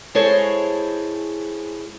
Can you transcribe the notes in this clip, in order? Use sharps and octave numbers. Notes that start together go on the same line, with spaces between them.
G#3 E4 G#4 A4 C5 C#5